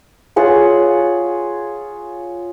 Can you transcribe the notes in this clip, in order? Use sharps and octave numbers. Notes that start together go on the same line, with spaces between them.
F4 G#4 C#5 F#5